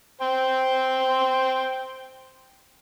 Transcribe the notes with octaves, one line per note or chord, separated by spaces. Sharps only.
C5 G5